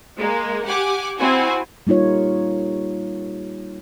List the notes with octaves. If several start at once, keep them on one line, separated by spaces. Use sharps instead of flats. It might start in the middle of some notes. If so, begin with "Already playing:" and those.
G#3 A#3
G4 F#5 G#5 D6
C4 E4 F#4 G#5
G3 A#3 D#4 F4 C#5